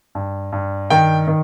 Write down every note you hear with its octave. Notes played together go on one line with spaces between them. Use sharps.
G2
G2
D#3 G5
D#3